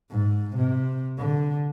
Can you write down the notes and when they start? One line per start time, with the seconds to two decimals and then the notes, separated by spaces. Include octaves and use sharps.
0.10 G#2
0.57 C3
1.18 D3